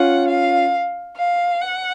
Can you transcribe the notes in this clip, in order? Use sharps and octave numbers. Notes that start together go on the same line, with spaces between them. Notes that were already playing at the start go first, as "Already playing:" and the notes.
Already playing: C#4 F4 F#5
F5
F5
F#5